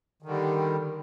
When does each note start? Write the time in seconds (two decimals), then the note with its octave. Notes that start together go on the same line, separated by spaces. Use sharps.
0.23 D#3
0.26 D3
0.29 G3